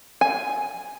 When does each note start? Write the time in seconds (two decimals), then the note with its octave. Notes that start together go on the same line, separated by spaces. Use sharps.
0.21 G#5